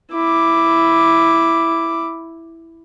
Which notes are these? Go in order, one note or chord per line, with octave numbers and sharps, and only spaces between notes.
E4 D6